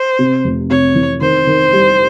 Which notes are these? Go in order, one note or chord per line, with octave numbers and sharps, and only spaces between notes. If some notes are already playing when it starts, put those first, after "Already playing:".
Already playing: C5
C3
F1
C3 C#5
E3
D#3 C5
D#3
G3